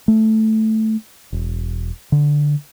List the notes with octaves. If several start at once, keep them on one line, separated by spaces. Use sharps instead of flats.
A3
E1
D3